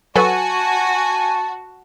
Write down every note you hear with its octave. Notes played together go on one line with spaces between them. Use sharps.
F#3 F#4 A4 B4 G#5 A5